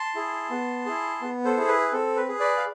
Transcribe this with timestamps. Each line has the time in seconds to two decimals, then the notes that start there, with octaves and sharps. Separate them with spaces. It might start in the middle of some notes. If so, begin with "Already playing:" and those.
Already playing: A5 C6
0.15 E4 G#4
0.50 B3
0.86 E4 G#4
1.21 B3
1.45 A4 C5
1.57 E4 G#4
1.68 B4
1.92 C4 A4
2.17 B4
2.29 G#4
2.40 B4 D5
2.57 F5